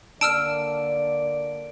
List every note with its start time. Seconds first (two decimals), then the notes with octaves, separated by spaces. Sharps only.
0.21 D3 A#3 D5 A5 E6 F6 D7